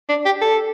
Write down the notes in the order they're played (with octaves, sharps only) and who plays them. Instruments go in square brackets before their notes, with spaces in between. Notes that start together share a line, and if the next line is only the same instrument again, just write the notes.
[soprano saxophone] D4
G4
A4